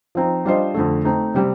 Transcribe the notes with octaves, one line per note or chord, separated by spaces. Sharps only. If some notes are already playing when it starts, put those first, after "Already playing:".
F3 C4 D#4
G3 D4 F4 C5 D#5
F2 D3 A3
A3 C4 D#4
C3 G3 C4 G4